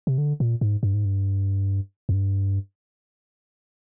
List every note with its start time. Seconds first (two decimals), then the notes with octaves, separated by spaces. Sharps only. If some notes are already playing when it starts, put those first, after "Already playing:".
0.07 C3
0.18 D3
0.40 A#2
0.61 G#2
0.83 G2
0.94 G#2
1.05 G2
2.09 F2
2.13 G2